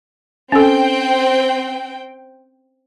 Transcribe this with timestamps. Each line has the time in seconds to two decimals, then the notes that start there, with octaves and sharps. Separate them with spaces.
0.52 C4 C#4 A4 G5